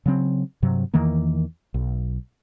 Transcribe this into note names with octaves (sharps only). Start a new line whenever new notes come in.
C#3 F#3 C4
G2 C3 F#3
E2 D#3 E3 A#3
B1